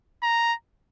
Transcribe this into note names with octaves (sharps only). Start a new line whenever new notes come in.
A#5